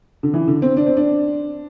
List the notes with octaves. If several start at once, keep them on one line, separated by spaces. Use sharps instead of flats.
D3
E3
D3
C4
D4
C4
D4